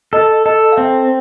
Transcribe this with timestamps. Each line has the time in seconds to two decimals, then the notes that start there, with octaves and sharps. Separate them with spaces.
0.13 A4 D#5
0.45 A4 D#5
0.72 F5
0.76 C4 E5